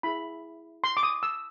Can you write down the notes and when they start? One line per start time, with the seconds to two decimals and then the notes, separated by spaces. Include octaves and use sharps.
0.03 E4 G#4 B4 B5
0.84 C6
0.97 D6
1.03 D#6
1.23 E6